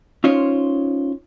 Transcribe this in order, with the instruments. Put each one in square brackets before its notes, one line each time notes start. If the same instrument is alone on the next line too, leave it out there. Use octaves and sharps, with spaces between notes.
[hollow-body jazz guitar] C#4 D#4 F4 C5 C#5